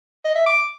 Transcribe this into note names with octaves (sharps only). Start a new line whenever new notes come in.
D#5
E5
D6